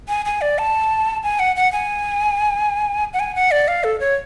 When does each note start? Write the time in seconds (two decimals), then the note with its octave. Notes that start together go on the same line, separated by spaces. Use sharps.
0.08 G#5
0.25 G#5
0.41 D5
0.58 A5
1.23 G#5
1.39 F#5
1.56 F#5
1.72 G#5
3.14 F#5
3.20 G#5
3.36 F#5
3.51 D5
3.68 F5
3.84 A4
4.00 C#5